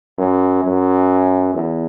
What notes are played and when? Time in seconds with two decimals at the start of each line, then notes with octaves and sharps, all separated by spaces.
0.18 F#2
0.63 F#2
1.54 E2